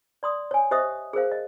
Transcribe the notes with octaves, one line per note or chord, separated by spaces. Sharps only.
D5 C6 D#6
C#5 G#5
G4 C5 D#5 E5 D#6
G#4 A#4 C5 F5
D#5